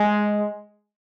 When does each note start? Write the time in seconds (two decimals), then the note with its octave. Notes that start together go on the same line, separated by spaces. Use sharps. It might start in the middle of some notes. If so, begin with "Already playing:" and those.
Already playing: G#3